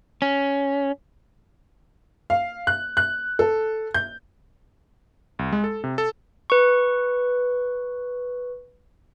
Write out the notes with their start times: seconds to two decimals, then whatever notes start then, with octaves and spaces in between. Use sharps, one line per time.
0.22 C#4
2.30 F5
2.67 F#6
2.97 F#6
3.39 A4
3.94 G6
5.39 C2
5.52 G#3
5.64 A4
5.84 C3
5.98 A4
6.50 B4 C#6